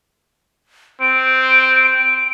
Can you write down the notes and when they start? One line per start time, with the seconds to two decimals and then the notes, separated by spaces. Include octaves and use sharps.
1.01 C4 D7